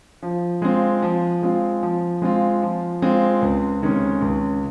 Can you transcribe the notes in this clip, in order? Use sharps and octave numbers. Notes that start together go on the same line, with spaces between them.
F3
G#3 C4 F4
F3
G#3 C4 F4
F3
G#3 C4 F4
F3
G#3 C4 F4
C#2
C3 D#3 G#3 C#4
C#2